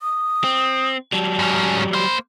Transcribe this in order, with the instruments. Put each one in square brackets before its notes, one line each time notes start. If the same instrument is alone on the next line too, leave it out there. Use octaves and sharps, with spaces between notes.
[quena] D#6
[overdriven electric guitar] C4
[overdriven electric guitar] F#3 G3 [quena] A5
[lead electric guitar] G#2 C#4
[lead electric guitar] A#3 C5 [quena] B5